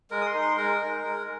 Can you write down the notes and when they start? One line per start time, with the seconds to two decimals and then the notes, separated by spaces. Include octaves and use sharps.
0.11 G#3 A#4
0.21 D#6
0.26 C6
0.34 D#4
0.42 C6
0.57 G#3 A#4
0.80 D#4
1.04 G#3